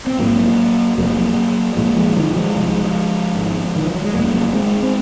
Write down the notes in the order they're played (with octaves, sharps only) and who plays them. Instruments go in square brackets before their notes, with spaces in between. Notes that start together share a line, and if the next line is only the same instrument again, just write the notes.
[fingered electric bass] C4
A#1 G#2 F#3 A#3
F1 F2 C3 F#3 A#3
A#1 A#2 F3 G#3
F3 G#3
D#3 F#3
F3 G#3
C2 C3 F3 G#3
G#1 G#2
D#3
F3
F#3
G#3
F1 F2 C#3 F#3 A#3
G#3 C4
C4